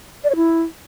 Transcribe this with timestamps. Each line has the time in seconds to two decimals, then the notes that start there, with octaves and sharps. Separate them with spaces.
0.24 D5
0.30 C#5
0.36 E4